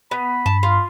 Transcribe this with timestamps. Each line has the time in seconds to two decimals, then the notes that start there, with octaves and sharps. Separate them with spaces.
0.11 B3 B5
0.46 G2 A5
0.63 F4